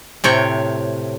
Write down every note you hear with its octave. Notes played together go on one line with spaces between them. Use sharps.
A2 C3 C#5 G5